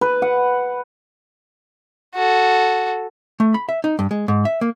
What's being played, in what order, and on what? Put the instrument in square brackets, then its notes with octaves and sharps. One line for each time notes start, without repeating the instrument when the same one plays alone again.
[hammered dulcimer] B4
F#5
[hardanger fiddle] F#4 A4
[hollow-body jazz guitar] A3
B5
E5
D#4
G2
G#3
G#2
E5
A#3